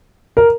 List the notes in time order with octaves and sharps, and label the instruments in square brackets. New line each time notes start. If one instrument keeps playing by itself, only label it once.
[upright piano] A#4